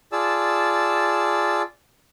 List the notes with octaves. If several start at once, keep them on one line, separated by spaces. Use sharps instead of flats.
F4 G#4 D5 A5 E6